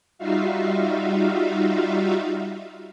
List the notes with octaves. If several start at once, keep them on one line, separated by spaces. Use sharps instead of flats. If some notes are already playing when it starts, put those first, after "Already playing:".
G3 D#4 F4 F#4 E5 F5